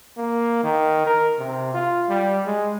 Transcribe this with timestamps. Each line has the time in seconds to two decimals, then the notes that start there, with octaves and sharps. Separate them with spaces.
0.17 A#3
0.63 D#3
1.07 A#4
1.39 C3
1.74 F4
2.09 G3
2.45 G#3